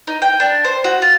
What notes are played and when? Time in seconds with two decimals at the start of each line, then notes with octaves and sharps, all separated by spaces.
0.07 D#4
0.22 G5
0.40 D4
0.64 C5
0.84 F#4
1.02 F4